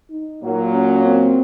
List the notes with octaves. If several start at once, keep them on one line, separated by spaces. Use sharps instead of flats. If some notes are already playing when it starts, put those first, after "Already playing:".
D#4
A#2 F#3 A#3
C#4
C4